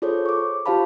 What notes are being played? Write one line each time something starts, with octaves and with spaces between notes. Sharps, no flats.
F4 G#4 A4 C5 C#5
C#6 D6
F4 G4 C5 F5 A5 B5